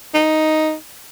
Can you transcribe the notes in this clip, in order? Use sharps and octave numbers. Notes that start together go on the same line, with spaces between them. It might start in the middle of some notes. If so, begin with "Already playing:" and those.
D#4